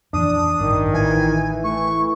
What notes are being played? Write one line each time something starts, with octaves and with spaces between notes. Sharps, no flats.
F2 A#2 E3 D4 D#6
A1 G2 D#3
A1 E3 G#5
A3 C#6